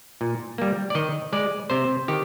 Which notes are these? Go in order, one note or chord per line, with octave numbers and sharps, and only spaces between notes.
A#2
G3 A#3
D5
D#3 D#5
G#3 D5
C3 C5
D#3 G4